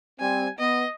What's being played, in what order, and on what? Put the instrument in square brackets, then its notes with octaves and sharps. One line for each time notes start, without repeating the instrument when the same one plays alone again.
[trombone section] G3 C4 [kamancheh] G#5
[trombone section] B3 [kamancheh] D#5